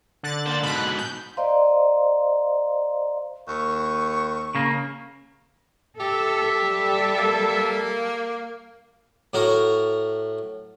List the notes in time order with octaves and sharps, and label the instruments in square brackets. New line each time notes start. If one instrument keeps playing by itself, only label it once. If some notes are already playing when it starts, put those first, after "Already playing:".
[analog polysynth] D3 F#6 A6
[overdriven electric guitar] A#3 C5
[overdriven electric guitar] G#2 B2 [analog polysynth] B5 F#6
[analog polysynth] G6
[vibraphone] C5 D5 D#5 F5 A#5 C6
[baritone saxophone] D#2 [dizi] C#6
[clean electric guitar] C#3 A#3
[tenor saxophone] G4 [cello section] A4 [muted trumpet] E5
[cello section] G3 A4
[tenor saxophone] A#3
[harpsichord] A2 F#4 A#4 A#5